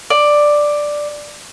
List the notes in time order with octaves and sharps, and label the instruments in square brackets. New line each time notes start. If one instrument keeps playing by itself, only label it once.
[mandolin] D5